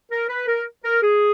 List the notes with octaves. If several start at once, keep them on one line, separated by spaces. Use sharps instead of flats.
A#4
B4
A#4
A#4
G#4